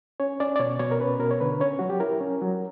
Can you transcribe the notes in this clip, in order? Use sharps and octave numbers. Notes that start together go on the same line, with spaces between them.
C#4 C#5
C#4 D5
D5
B2 C#5
B2 C#5
A#4
C#4 B4
B2 A#4
C#5
D3 B4
C#4 C#5
F#3 F#4
G4
E4 A#4
C#4
F#3